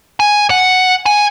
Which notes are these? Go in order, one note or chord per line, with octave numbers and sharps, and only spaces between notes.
G#5
F#5
G#5